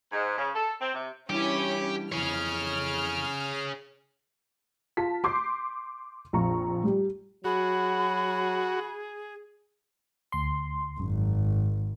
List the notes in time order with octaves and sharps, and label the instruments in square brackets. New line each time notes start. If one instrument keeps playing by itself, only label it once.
[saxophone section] G#2
C#3
A4
C4
C3
[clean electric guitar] E3 G3 D4 [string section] C#4 E4 [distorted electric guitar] G4
[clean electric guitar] F2 E3 [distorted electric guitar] G#4 C#5 [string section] F6
[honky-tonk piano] F4 A5 B6
C6 D6 G6 C7
A#1 F2 F4 A#5 C#6
G3 G4
[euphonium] F#3 [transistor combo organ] F#4 [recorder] G#4 [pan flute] B5
[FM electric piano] D2 C6
[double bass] G#1 [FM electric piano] F#2